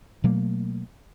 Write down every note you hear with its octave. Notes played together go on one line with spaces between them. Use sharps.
B2 F#3 A3 A#3